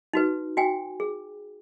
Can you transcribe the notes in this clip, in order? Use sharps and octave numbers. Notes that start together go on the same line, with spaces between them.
D#4 F#4 B4
F#4 G5 G#5
G#4